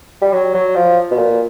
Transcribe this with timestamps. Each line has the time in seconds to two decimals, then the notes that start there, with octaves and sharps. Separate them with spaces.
0.22 G3
0.33 F#3
0.54 F#3
0.76 F3
1.11 B2
1.19 A#2